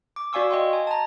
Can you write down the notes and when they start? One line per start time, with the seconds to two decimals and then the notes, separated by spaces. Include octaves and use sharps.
0.16 D6
0.33 F#4 D5 F5 G#5 C#6 E6
0.51 D#5 G5 C6
0.73 G#5
0.87 A5 A#5